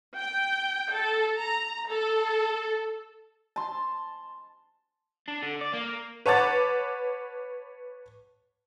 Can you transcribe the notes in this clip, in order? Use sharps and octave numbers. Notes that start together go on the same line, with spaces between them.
G5
A4
A#5
A4
A5 C6
D4
D3
D5
A#3
B4 C#5 F#5 A5 D6 A6